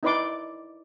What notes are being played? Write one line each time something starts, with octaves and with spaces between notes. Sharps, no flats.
D#4 E4 B4 D5 C6 D6